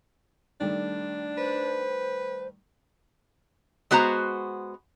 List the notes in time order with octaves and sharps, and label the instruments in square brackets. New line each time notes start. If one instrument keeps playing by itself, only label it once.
[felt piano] D#3 G3 A3 [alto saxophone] D4
[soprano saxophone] B4 [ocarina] C5
[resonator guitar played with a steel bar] G#3 B3 F#4 C5 A#5